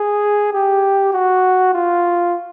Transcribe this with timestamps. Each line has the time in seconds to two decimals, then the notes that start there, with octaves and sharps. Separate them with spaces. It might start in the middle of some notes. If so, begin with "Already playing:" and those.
Already playing: G#4
0.53 G4
1.13 F#4
1.73 F4